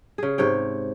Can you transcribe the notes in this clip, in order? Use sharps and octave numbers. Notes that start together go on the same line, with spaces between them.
C#3 G#4
G#2 C3 C#5 G5